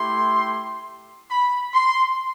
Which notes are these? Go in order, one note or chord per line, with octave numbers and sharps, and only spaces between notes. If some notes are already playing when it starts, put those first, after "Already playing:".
Already playing: A3 E4 G4 C6
B5
C6